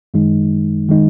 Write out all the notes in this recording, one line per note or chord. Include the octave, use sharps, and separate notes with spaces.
F#2 D#3 G#3 D#4
D#3 G#3 D#4